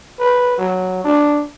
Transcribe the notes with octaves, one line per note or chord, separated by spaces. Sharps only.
B4
F#3
D4